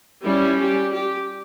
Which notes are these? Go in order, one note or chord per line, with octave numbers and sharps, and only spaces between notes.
G3 C#4 E4
G4
G4